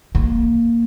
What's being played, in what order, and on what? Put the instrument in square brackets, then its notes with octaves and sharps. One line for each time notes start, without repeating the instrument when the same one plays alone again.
[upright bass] A#3